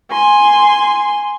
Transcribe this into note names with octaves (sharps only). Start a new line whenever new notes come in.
G#5 C6